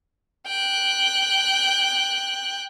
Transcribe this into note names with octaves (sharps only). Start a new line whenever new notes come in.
G5 F#6